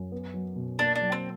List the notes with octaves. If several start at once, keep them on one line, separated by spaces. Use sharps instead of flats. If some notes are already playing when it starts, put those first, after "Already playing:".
Already playing: F#2
B3
F#3
B2
A#3 D4
D4
F#3
C4